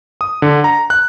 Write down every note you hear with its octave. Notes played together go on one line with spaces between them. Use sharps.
D#6
D3
A#5
F#6